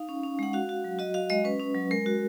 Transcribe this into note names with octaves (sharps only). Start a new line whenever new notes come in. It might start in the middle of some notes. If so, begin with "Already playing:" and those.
Already playing: D#4 F5
C#4
C#4
G#3 F#5
F#4 F5
F#4
F#3
F#4 D#5
F#4 F5
G#3 D#5
C#4 B4
C#4
F#3
G#3 A#4
F#4